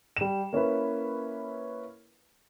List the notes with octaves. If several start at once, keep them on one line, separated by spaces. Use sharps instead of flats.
G3 E7
A#3 C#4 E4 B4